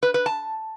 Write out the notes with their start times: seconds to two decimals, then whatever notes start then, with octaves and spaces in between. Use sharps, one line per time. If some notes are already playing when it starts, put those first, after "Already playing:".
0.03 B4
0.14 B4
0.26 A5